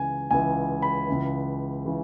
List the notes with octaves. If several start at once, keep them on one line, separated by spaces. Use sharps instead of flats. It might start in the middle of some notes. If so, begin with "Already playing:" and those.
Already playing: C#2 C#3 E3 G#5
C#2 C#3 E3 G#5
B5
C#2 C#3 E3
C#3 E3